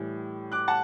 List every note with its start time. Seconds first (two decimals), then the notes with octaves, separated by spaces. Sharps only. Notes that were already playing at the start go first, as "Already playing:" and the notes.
Already playing: A2 E3 G3
0.52 D6 F#6
0.68 F#5 A5